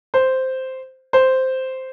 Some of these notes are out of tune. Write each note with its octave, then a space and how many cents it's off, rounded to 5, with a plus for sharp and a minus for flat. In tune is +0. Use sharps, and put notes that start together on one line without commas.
C5 -5
C5 -5